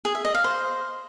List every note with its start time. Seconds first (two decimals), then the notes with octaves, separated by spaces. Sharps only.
0.05 G#4
0.15 E5
0.25 D#5
0.34 F5
0.44 C5